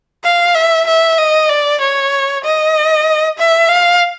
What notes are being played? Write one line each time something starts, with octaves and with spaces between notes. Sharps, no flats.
F5
E5
E5
D#5
D5
C#5
D#5
E5
F5